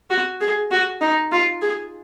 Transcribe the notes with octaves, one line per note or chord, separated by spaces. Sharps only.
F#4
G#4
F#4
D#4
F4
G#4